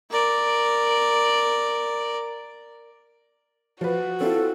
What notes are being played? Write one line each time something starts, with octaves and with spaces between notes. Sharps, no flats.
A#4 D5
F3 F#4 B4
C4 E4 F4 A4